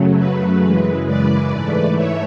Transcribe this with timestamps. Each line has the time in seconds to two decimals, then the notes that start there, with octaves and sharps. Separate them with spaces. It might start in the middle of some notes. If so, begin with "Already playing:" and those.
Already playing: F#2 C#3 F#3 A3
0.17 B4
0.61 F#2 C#3 E3 G#3
1.06 B4 D5
1.50 G#2 E3 A3
1.95 C#5 E5